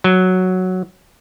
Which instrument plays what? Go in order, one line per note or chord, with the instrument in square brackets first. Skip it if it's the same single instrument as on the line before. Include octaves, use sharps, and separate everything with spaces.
[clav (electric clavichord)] F#3